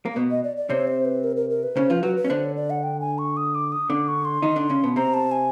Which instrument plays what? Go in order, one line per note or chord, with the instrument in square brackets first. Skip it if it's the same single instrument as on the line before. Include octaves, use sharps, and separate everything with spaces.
[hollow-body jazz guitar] A#3
B2 B3
[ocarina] D#5
D5
D5
[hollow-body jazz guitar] C3 C4 [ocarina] C#5
[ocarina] C5
B4
A#4
A#4
A#4
B4
[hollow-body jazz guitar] C#3 C#4 [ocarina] C5
[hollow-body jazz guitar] F3 F4 [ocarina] B4
[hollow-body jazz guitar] F#3 F#4 [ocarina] B4
[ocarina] B4
[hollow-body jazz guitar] C#4
[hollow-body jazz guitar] D3 D4 [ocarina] C5
[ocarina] C#5
D5
F#5
G5
G#5
C#6
D#6
D6
D#6
[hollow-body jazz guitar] D3 D4 [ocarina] D6
[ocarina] C#6
C6
[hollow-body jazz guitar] D#3 D#4
D3 D4
C#3 C#4
B2 B3
[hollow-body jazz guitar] C3 C4 [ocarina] A#5
[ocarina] A5
G#5